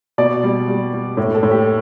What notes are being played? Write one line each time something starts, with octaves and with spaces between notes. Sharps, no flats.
B2 D5
G3
G3
G3
A2
A4
A2
G4